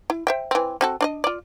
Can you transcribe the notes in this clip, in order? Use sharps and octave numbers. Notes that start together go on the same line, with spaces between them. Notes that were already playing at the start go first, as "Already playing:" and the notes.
E4
C5 E5 G5
E3 C4
C4 F#4 A4
D4 D5 D#5
F4 D5